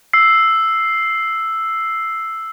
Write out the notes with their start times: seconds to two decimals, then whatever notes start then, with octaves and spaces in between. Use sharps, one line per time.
0.13 E6 C7